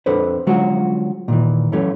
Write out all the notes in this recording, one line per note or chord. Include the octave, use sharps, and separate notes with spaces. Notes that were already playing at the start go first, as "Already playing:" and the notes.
F2 D4 A4 B4 C5
D3 F3 F#3 G#3 C#4 F#4
A#2 D#3 E3
F#2 E3 F#3 A3 C#4